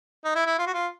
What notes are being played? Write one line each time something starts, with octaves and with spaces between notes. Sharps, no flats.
D#4
E4
E4
F4
F#4
F4